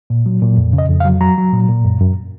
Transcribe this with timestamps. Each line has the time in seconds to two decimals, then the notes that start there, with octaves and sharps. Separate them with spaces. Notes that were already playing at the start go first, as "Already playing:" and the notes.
0.10 A#2
0.26 F#3
0.42 A#2
0.57 F2
0.73 C#3
0.78 D#5
0.89 F2
1.00 F5
1.05 F#3
1.21 F#3 A#5
1.38 F#3
1.53 A#2
1.69 A#2
1.85 F#2
2.00 F#2